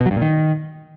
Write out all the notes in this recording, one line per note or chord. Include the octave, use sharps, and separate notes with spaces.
B2
F#3
G2
A#2
D#3